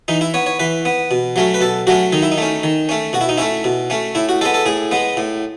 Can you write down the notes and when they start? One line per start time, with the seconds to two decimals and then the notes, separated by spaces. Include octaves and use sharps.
0.08 E3 D#4
0.21 E4
0.34 B3 C#5
0.46 C#5
0.59 E3 B4
0.85 B3
1.11 B2
1.36 F#3 A3 C#4
1.54 B4
1.61 B2 A4
1.87 F#3 A3 C#4 F#4
2.13 D#3 D#4
2.22 E4
2.32 D#4
2.38 A3 C#4
2.63 D#3
2.89 A3 C#4
3.13 B2 F#4
3.21 E4
3.29 D#4
3.38 A3 C#4 E4
3.64 B2
3.90 A3 C#4
4.15 A2 E4
4.29 F#4
4.41 G#3 A4
4.46 B3
4.54 A4
4.66 A2 G#4
4.91 G#3 B3
5.17 A2